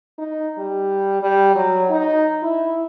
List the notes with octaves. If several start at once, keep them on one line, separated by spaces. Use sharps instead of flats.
D#4
G3
G3
F#3
D#4
E4